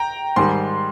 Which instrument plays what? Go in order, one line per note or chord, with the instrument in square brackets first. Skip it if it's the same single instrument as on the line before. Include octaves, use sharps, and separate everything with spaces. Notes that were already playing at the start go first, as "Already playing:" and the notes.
Already playing: [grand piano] G5 A#5
[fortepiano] G#2 D#3 G3 [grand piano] C6